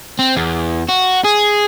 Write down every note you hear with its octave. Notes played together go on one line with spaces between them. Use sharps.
C4
E2
F#4
G#4